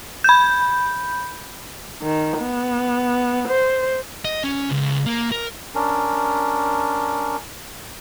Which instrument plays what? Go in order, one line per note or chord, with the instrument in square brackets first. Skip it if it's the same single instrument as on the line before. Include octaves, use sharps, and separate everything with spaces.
[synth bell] B5 G6
[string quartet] D#3
B3
C5
[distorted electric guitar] D#5
C#4
C#2
A#3
A#4
[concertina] C#4 D4 A#4